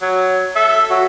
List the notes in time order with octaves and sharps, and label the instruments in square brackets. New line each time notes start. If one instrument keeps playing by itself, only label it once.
[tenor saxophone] F#3
[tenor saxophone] A4 [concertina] E5
[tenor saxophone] F#3 [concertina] F#4